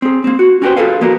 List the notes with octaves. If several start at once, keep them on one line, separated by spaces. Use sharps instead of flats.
C4 G#4
A#3 C4
F#4
C#4 F#4 G4 A4 B4 C5
F4 G#4 A4 B4 F5
F3 A#3 B3 F#4 A#4